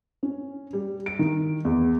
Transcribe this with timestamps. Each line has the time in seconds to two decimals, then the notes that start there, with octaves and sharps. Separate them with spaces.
0.23 C#4
0.73 G3
1.06 D7
1.19 D#3
1.65 E2